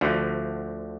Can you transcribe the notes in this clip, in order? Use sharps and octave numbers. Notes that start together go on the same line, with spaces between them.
D2 D3 F3